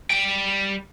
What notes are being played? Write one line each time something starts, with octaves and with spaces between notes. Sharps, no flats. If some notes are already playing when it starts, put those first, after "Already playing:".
G3 G5